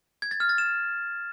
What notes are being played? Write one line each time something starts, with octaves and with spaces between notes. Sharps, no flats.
G#6
A6
F6
A6
E7